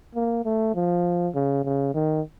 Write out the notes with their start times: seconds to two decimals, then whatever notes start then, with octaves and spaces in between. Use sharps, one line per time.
0.15 A#3
0.45 A3
0.75 F3
1.34 C#3
1.64 C#3
1.94 D#3